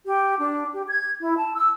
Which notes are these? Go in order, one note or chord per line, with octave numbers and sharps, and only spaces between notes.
G4
D4
G4
G#6
E4
A5
E6